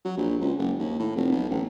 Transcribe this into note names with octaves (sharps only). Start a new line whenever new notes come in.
F#3
A#1
C#2
F#1
D#2
A2
F1
B1
A1